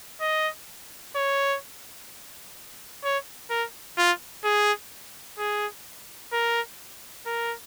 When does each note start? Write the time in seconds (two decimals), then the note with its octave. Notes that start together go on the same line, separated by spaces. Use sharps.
0.21 D#5
1.16 C#5
3.04 C#5
3.50 A#4
3.98 F4
4.44 G#4
5.39 G#4
6.33 A#4
7.26 A#4